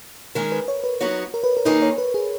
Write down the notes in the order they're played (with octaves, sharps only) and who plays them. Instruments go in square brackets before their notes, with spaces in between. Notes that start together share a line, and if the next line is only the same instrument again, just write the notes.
[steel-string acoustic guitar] D#3 G#3 C#4 G#4 [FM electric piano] A#4
[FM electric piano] B4
C#5
B4
[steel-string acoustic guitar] F#3 B3 D#4 F#4 [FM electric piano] C#5
[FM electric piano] A#4
B4
A#4
[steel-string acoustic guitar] D#3 A#3 D#4 G#4 [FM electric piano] B4
[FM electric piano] C#5
B4
G#4